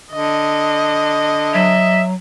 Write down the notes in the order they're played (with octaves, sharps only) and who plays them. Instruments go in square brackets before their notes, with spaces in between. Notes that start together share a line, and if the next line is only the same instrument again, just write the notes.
[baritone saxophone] D3 [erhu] D#5
[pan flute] F#3 [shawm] E5